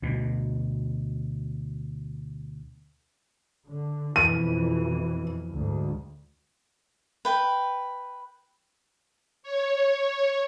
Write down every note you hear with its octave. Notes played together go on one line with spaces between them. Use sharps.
D2 B2
D3
F2 B2 E3 D#7
D2 G#2
B4 G5
C#5